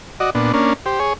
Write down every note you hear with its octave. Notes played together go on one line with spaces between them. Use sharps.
F#4 D5 D#5
A#2 B3 D4
A#3 C#4 D4
G4 C5
G#4 C#5